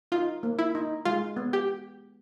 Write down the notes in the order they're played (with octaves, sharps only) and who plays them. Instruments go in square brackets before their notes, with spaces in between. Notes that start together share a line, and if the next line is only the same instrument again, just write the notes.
[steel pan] D#4 [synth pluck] F4
[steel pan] A#3
[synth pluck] E4
[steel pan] D#4
[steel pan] G#3 [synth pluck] F4
[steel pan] B3
[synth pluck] G4